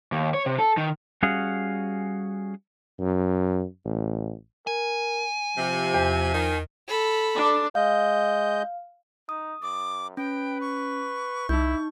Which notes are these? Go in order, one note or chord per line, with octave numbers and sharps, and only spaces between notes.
D#2
C#5
C3
A4
D#3
G3 C#4 F#4 G#4 F5 F#5
F#2
A1
A#4 G#5
C3 F3
E2
D#3
A4 B5
D4
G#3 D#5 F5 G6
D#4 D#6
F#2 D6
C#4 B4 G5
C#6
C2 D#4 E4 G6